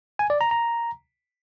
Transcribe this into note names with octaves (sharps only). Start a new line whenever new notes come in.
G#5
D5
A#5
A#5